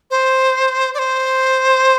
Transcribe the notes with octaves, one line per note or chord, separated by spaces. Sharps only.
C5
D5
C5